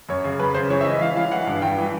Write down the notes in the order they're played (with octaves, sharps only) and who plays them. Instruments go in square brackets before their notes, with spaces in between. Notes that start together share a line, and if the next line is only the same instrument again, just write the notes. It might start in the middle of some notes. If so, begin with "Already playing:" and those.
[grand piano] F#2 C#5
C#3
F#2 B4
C#3 C5
E3 C#5
E5
E3 D#5
E3 F5
E3 F5
E3 F#5
G2
G2 G5
E3